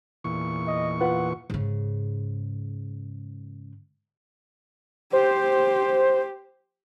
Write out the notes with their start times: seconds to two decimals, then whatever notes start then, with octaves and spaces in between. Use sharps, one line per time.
0.24 E2 A#2 C#6
0.67 D#5
1.01 F4 B4 F#5
1.50 G#2 C#3
5.13 G4 C5